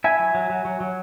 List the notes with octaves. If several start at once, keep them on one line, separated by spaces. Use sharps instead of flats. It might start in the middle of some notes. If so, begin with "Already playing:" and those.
E4 E5 G#5
F#3
F#3
F#3
F#3
F#3